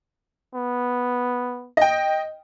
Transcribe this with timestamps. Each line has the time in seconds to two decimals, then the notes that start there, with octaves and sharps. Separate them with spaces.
0.55 B3
1.77 D#5 G5